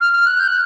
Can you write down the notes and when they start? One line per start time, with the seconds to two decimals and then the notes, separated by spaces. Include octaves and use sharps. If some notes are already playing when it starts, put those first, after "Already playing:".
0.01 F6
0.13 F6
0.26 F#6
0.39 G6
0.48 F#6